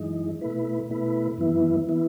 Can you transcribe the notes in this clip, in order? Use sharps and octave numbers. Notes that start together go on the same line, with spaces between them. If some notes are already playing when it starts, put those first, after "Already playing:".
Already playing: F#2 E3 G#3 D#4
B2 A3 E4 B4
B2 A3 E4 B4
F#2 E3 B3 E4
E3 B3 E4